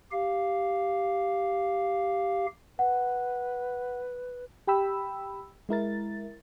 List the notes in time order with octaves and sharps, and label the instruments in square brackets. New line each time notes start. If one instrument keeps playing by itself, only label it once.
[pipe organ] G4 F5
[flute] B4 [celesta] F#5
[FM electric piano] G4 G5 B5 E6
G#3 E4 A#4 A6